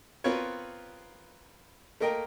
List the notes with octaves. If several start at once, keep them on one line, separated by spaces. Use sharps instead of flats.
B3 C4 F4 A#4 B4 C#5
A3 A#3 A#4 D#5 G5